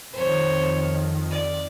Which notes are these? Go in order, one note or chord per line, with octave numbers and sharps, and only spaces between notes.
F2 D#3 C5 C#5
D5